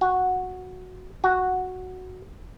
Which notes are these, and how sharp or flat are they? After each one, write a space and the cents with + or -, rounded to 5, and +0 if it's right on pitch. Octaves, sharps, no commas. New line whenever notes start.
F#4 -5
F#4 +0